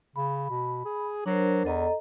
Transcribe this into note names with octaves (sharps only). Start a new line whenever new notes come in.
C#3 B5
B2
G#4
F#3 D4 A#4 C5
E2 A4 D#5 A#5